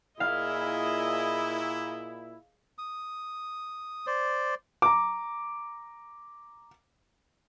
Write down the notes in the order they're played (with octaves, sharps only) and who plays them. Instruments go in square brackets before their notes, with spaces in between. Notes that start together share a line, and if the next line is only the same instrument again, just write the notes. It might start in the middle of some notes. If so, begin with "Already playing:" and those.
[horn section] A#2 E4 [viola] G#4 D#5 [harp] F5
[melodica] D#6
C5 D5
[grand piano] A#5 D6